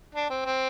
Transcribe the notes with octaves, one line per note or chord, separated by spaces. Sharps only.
D4
C4
C4